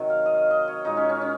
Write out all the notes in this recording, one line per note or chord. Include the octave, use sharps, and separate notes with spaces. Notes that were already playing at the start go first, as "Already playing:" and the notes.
Already playing: C3 D#3 F#3
F5
D#5
F5
D#5
C#5
A#2 G#3 D#4
C#4
C#4
C#4